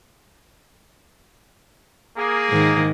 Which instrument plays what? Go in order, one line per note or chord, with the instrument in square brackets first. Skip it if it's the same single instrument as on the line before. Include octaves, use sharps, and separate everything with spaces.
[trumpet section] A#3 G#4
[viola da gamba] G#2 D#3